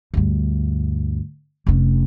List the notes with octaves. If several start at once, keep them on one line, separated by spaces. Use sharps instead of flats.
D2 G2
F1 C#4